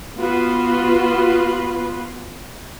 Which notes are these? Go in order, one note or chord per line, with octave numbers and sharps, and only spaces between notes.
B3 F4 F#4 B4 C6